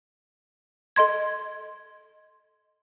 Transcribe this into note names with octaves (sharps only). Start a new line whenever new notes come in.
A4 D#5 C6 G#6